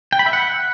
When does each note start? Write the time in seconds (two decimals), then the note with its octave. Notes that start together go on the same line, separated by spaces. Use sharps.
0.13 G5
0.19 B5
0.26 E5
0.33 F#5